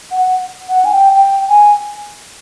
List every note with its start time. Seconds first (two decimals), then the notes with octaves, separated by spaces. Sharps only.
0.12 F#5
0.69 F#5
0.85 G#5
0.92 G5
1.15 G5
1.49 G#5